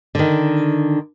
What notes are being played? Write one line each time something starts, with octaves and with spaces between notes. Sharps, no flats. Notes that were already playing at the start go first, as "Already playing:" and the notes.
D3 D#3